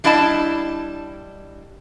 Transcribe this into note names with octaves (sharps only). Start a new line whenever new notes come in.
G3 D4 E4 D#5 F#5 A5